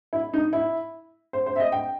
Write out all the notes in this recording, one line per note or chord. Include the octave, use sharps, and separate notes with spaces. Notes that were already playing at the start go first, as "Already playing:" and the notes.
E4
D#4
E4
C5
C5
E5
D#5
G5